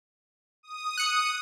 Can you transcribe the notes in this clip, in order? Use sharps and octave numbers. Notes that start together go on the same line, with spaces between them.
D#6
F#6 C#7